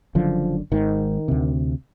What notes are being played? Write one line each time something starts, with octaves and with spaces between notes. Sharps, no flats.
F#1 F#2 D3 F3
G#1 G#2 D#3
D2 C3